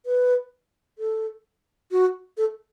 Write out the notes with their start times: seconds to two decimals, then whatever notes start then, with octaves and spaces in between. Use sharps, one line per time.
0.06 B4
0.98 A4
1.91 F#4
2.37 A4